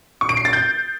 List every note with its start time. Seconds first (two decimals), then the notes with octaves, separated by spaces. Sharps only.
0.21 C#6
0.29 D7
0.37 C7
0.45 A6
0.53 G6